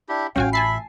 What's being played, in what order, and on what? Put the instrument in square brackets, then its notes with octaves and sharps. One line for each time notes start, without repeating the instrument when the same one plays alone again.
[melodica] D4 E4 G4
[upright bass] A1 F4 [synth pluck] C#4 F#4 G#5 [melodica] F5 G5
[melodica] E5 [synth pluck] G#5 A5 C7 [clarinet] B5